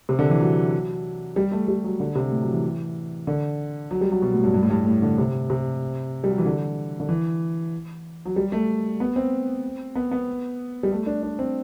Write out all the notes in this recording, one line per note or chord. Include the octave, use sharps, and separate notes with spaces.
C3
D3
E3
F#3
G3
A3
G3
F#3
D3
C3
A2
F#3
E3
D3
F#3
G3
F#3
B2
A2
G2
G2
A2
G2
A2
D3
C3
C3
G3
F#3
E3
D3
D3
E3
F#3
G3
A3
B3
C4
B3
B3
G3
A3
D4
D4
C4